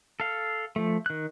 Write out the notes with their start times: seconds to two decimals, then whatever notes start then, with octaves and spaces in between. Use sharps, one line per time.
0.20 A4 F5
0.76 F3 A3
1.06 D#3 F#6